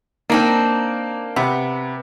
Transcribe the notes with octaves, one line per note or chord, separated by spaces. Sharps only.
A#3 C4 D4 D#4
C3 B3